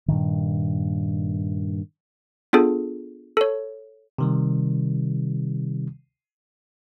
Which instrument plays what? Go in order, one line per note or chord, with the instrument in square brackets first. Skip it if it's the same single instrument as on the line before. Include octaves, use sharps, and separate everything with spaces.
[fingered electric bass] G2 A#2 D#3
[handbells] B3 D4 F4 G#4 A4
A4 C#5
[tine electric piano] C3 D#3 G3